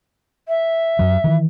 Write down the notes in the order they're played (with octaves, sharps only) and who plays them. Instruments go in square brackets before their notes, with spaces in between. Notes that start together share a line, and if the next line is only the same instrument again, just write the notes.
[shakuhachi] E5
[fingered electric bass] F#2 F#3
D#3 E3